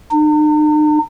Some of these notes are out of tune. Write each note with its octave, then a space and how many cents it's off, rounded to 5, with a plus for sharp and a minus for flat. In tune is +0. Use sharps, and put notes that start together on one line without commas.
D#4 -45